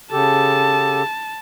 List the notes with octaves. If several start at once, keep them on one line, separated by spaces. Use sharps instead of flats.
C#3 G4 A4 A5